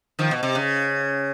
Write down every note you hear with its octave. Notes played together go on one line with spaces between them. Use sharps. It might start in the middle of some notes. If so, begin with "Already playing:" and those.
D#3 F3
B2
C3
C#3